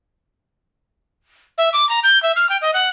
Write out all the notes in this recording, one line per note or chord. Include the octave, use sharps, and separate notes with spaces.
E5
D6
A#5
G6
E5
F6
G5
D#5
F#5